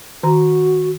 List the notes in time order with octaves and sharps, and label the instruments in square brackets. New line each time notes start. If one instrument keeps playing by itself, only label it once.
[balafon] D#3 A#5 [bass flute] F#4